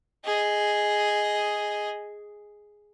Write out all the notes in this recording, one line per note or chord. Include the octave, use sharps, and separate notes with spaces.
G#4 D#5